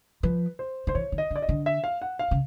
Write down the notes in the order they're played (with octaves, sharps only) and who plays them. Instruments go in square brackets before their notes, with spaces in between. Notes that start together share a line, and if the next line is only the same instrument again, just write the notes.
[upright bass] F3 [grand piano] B4
[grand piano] C5
[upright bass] D#3 [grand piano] C5
[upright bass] E3 [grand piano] C#5
[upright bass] D#3
[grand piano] D#5
[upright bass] D3
[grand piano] D5
D#5
[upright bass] D3
[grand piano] E5
F5
F#5
F5
[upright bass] C#3